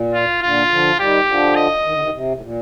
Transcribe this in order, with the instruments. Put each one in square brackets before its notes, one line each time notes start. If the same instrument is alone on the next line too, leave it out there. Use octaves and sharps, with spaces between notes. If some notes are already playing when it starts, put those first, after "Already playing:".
Already playing: [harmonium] A#2
[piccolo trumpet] F4
[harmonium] A#2 D3 [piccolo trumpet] F4
[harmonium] D3 F3
[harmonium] D#3 G3 [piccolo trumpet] G4
[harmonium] D3 F3
[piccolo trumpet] D#5
[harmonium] D#3
D3
C3 D#3
C3
A2
A#2